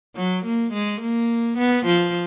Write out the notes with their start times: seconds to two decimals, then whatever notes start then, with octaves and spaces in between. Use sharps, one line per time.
0.16 F#3
0.45 A#3
0.73 G#3
1.01 A#3
1.58 B3
1.86 F3